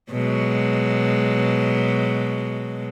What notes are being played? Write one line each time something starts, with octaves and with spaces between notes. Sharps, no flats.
B2 F#3 G#3